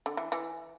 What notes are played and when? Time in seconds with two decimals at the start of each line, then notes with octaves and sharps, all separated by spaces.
0.06 D3
0.17 E3
0.32 E3